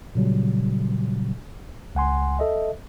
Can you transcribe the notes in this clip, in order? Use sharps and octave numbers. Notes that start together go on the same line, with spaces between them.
A#2 C#3 F#3 G3
C#2 F#5 G#5 C6
A4 D#5 E5